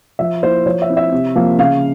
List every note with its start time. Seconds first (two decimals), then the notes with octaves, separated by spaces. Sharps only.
0.19 F3 E5
0.43 A#3 E4 C5
0.66 F3 C#5
0.82 E5
0.89 C4 E4
0.97 E5
1.12 C3
1.36 F3 A#3
1.59 C#3 F5